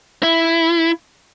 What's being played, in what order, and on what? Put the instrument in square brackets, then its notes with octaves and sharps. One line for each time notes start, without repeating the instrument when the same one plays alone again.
[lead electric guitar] E4